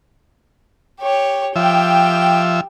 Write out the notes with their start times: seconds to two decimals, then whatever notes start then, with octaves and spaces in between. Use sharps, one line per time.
1.01 G4 C#5
1.56 F3 G4 E5 G5